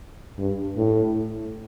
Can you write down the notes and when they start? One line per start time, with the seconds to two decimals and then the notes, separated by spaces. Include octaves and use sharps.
0.38 G2
0.77 A2